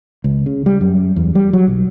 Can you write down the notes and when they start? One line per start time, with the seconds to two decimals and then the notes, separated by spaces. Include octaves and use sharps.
0.24 C#2
0.46 C#3
0.66 G3
0.81 F#2
1.16 E2
1.35 G3
1.53 F#3
1.68 B1